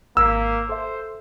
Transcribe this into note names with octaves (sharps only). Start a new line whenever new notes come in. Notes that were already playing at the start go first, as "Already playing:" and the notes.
G#1 A#3 E6 B6
A4 C5 E5